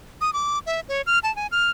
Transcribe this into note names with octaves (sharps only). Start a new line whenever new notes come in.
D#6
D6
E5
C#5
F6
A5
G#5
F6